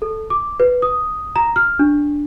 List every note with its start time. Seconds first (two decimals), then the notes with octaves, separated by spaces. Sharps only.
0.02 A4
0.30 D6
0.60 B4
0.82 D#6
1.36 A#5
1.56 F6
1.79 D4